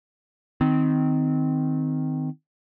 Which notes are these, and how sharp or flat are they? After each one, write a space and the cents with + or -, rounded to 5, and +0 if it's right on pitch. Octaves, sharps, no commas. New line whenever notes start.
D#3 +0 C4 -20